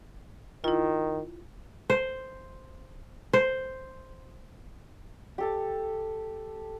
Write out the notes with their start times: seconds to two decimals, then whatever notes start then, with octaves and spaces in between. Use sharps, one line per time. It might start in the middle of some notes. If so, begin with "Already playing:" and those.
0.64 D#3 E4 F4
1.90 C5
3.33 C5
5.38 G4 A4 A5